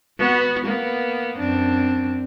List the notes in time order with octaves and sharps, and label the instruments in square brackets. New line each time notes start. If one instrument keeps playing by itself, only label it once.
[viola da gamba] B3 F#4
A#3 B3
F#2 C4 D4